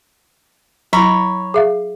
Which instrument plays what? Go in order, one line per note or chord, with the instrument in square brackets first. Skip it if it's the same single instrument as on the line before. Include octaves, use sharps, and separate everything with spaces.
[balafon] F#3 E4 [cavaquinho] C#5 A#5 B5
[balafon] G#4 E5 F5